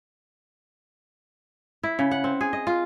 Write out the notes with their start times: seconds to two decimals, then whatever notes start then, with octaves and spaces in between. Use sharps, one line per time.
1.83 E4
1.99 C#3
2.11 F#5
2.24 C4
2.41 G#4
2.53 D#5
2.67 F4